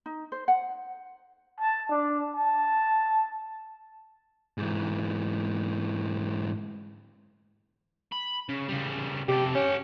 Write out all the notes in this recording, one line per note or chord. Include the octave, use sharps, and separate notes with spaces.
D#4
C5
F#5
A5
D4
A5
G#2 E3
B5
C#3
C#3 G3
C3 G4 A4
C#4 G4 F#5